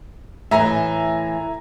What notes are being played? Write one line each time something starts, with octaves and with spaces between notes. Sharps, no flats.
A2 E3 E5 G#5 A#5